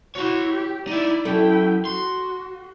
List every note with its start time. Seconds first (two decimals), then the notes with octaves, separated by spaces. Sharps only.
0.15 E4 F#4 C#5 C6
0.52 G4
0.87 D#4 E4 D5 E5
1.25 F#3 C#4 E4 A4 G5
1.85 F#4 C6